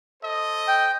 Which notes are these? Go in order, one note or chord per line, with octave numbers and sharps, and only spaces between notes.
A4 C5 D#5
G5